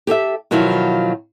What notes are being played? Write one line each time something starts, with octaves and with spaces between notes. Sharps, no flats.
G4 A4 D5 E5
B2 D#3 F3 F#3 E4 F4